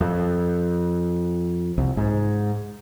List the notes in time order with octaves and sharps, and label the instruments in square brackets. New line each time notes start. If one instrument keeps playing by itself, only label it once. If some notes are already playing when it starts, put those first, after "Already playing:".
[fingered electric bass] F2
C2
G#2